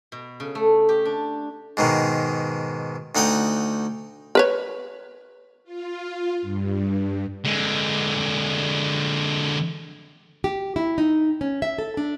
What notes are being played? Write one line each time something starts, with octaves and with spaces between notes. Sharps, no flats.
B2
C#3
A3
G4
D4
G#2 B2 D#3
D2 D#4 F#5 G5 D#6
A#4 B4 C#5
F4
G2
D3 G#3
G4
E4
D#4
C#4
E5
A4
D4